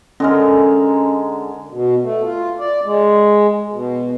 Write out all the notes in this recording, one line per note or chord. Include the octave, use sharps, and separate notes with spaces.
D3 G#3 C#4 A#4
B2
A3
F4
D5
G#3
B2